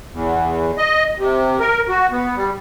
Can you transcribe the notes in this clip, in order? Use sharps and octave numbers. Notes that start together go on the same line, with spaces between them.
E2
D#5
C3
A#4
F#4
B3
G3